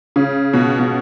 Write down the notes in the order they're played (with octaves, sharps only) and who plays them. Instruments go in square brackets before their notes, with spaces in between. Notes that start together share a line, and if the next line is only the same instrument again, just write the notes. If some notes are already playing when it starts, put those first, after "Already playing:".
[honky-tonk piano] C#3
B2
B2